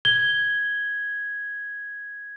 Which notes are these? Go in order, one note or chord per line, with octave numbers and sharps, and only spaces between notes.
G#6 G7